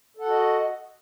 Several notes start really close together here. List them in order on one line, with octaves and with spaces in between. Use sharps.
A4 F#5 F#4 D#5